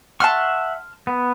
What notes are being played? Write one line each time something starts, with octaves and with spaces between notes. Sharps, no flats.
E5 F#5 A5 C6 C#6 F6
B3